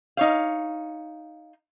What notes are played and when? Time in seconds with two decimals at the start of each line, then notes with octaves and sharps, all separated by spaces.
0.17 D#4 C#5 F5